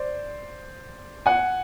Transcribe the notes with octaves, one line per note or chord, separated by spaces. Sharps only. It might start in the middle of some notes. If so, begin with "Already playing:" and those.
Already playing: C5 D5
F#5 G#5